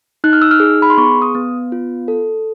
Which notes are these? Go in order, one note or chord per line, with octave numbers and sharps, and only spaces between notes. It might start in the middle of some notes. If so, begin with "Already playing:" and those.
D#4 F#6
F6
E6
F6
G#4
B5
C6
B3 C#6
D#6
B3
F4
A4